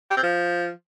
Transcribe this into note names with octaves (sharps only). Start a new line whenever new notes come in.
G4
C4
F3